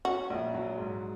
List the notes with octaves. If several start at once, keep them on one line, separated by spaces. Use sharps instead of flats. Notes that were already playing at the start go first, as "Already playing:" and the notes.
C#4 F#4
A#1
F#3
G#2